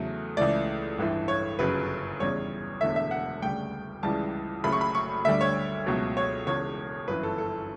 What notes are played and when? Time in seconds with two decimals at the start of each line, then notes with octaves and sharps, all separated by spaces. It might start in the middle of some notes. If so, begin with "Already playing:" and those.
Already playing: E2 C#3 F#3 A3
0.37 C#2 C#3 E3 A3 D5
0.98 A1 G2 E3 A3
1.28 C#5
1.59 G1 F#2 C#3 F#3 B4
2.20 E2 C#3 G3 C#5
2.81 E1 E2 D3 A3 E5
2.96 E5
3.11 F#5
3.42 D2 C#3 G3 G5
4.03 C#2 C#3 E3 G3 A5
4.64 F#1 F#2 C#3 F#3 A3 B5
4.72 C#6
4.81 B5
4.95 C#6
5.25 D2 D3 G3 E5
5.41 C#5
5.86 C#2 B2 F#3 A3
6.17 C#5
6.47 E1 E2 C#3 C#5
7.08 G1 F#2 E3 B4
7.23 A4
7.38 A4